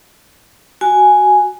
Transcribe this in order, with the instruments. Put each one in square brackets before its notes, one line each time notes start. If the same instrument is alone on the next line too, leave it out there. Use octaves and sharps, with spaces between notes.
[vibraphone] F#4 G#5